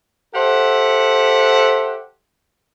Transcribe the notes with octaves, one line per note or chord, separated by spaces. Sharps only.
G4 A4 C5 E5 F#5